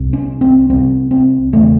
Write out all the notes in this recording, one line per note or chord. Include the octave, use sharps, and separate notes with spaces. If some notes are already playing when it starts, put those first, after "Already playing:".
Already playing: C2 C3
C#4
C4
C2 C3 C4
C4
E1 E2 C#3 A3